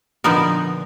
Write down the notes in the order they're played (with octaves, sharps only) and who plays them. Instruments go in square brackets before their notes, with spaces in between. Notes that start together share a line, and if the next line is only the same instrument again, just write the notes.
[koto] A#2 D3 F3 B3 D#4 A#4